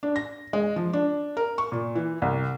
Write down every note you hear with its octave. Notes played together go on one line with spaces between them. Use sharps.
D4
A#6
G#3
F3
D4
A#4
C#6
A#2
E3
C2